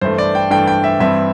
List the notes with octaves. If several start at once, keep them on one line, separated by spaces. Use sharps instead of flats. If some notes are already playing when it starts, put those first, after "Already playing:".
G2 E3 A3 D4 C5
D5
G5
G2 E3 A3 D4 G5
G5
E5
G2 E3 C4 E5